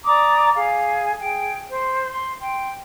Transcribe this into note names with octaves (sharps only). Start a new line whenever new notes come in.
D5 A#5 D6 D#6
G#4 F5
G#4 G5
C5
C6
G5 C6